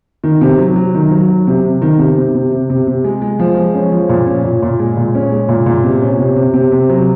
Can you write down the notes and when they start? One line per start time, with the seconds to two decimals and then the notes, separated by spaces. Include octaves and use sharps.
0.24 D#3
0.41 C3
0.58 F#3
0.76 F#3
0.95 D#3
1.11 F#3
1.28 F#3
1.47 C3
1.65 C3
1.82 D#3
1.98 C3
2.17 C3
2.35 C3
2.52 C3
2.70 C3
2.87 C3
3.04 G#3
3.22 G#3
3.39 F3
3.56 G#3
3.74 C#4
3.92 F3
4.09 A#2
4.27 C#4
4.44 A#2
4.62 A#2
4.79 G#3
4.97 A#2
5.15 C#4
5.32 G#3
5.49 A#2
5.66 A#2
5.84 C3
6.01 C#4
6.19 C3
6.36 C3
6.54 C3
6.72 C3
6.90 F#3